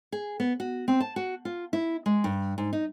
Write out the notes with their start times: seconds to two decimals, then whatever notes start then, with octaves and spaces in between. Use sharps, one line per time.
0.12 G#4
0.40 B3
0.60 F#4
0.88 C4
1.00 A5
1.16 F#4
1.45 F4
1.73 E4
2.06 G#3
2.24 G2
2.58 G#2
2.73 D#4